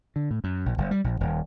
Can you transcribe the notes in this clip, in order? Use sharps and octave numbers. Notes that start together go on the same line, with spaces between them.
D3
A2
F#2
A#1
F#1
G3
A#1
D#1